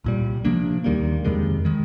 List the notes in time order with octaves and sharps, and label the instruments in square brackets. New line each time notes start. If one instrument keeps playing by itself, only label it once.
[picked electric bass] C2 A#2 G3
C3 F3 A#3 D4
D#2 D#3 G3 A#3
F2 C3 D#3 G#3
D#3 G#3